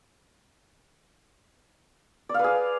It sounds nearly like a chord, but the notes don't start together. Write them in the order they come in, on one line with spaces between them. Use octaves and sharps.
D5 F5 B4 G#4